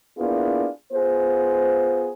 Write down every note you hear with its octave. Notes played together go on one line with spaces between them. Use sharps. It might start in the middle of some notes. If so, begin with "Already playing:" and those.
A#3 B3 D4 E4 F4 G#4
B3 F4 G#4 C5